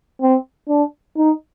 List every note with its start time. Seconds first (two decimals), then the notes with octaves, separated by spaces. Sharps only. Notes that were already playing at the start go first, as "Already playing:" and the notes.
0.22 C4
0.69 D4
1.17 D#4